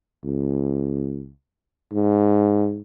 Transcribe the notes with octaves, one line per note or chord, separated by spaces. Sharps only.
C#2
G#2